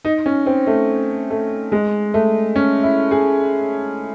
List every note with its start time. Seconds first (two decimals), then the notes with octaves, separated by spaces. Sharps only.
0.05 D#4
0.26 C#4
0.46 C4
0.67 A3
1.30 A3
1.72 G#3
2.14 A3
2.56 C#4
2.83 E4
3.11 G#4